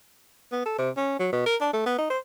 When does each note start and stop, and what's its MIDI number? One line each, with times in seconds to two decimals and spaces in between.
0.52 0.61 59
0.65 0.75 69
0.78 0.90 48
0.97 1.18 61
1.19 1.27 54
1.32 1.45 47
1.46 1.55 70
1.61 1.71 62
1.73 1.82 57
1.86 1.96 59
1.98 2.07 63
2.10 2.19 72